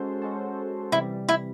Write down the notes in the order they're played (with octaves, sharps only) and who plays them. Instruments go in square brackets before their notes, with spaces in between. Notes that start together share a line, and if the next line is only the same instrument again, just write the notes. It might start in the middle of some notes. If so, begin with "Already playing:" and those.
Already playing: [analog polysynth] G#3 C#4 F#4 A4 C5
G#3 C#4 F#4 A4 C5
[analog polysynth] C3 E3 G3 [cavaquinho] E4
[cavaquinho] E4